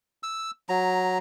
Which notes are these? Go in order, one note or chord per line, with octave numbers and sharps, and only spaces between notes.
E6
F#3 A#5